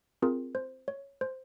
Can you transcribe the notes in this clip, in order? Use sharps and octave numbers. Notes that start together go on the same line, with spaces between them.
C4 F4 G#4 A#4
C5
C#5
C5